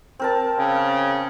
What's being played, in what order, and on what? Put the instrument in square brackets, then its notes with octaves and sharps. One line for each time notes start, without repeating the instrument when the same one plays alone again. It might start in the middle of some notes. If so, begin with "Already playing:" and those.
[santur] C4 A#4 A5
[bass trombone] C#3